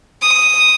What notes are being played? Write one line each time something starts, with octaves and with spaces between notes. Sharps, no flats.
D#6